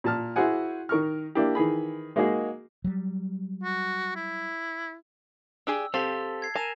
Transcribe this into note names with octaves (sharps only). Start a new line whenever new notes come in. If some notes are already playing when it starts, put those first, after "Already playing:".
A#2 A5 F6
E4 F#4 G#4 C5 F#5 G#5
D#3 A#4 C#6 F6
A#3 D4 E4 G4
D#3 E3 G#4 B5
G#3 A#3 D#4 F#4 G#4
F#3 G3
F#4
E4
D4 G4 G#4 E6
C4 G4 A4 F5 A5 A6 B6
G#6 C7
A#4 G#5 A5 D#7 E7